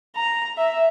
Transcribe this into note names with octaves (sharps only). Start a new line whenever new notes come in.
A#5
E5